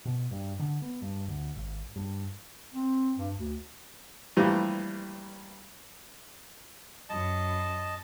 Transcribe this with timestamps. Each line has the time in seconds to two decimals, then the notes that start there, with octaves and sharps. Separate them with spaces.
0.05 B2
0.31 G2
0.59 D3
0.82 B3
1.02 G2
1.28 D2
1.56 G#1
1.96 G2
2.72 C4
3.17 G2
3.37 D2
4.37 G2 A#2 E3 F3 G3 A3
7.09 F#2 D#5 A5